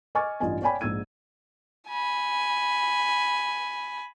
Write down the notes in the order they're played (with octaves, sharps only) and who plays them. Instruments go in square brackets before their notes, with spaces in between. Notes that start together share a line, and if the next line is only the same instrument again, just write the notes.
[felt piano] D#5 G#5 C#6 D6 F6 A6
A1 G2 D#4 F4 D#5 G#5
C#5 D5 G5 G#5 B5
A#1 G#2 E6 G#6 D#7
[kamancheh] G#5 B5